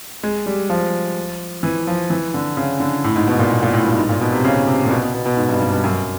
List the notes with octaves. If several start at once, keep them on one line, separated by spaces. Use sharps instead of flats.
G#3
G3
F3
E3
F3
E3
D3
C#3
D3
A2
G#2
B2
A#2
B2
A#2
A2
G2
G#2
A#2
B2
C3
C#3
C3
A#2
B2
B2
B2
B2
G#2
G2
G2
G2
F#2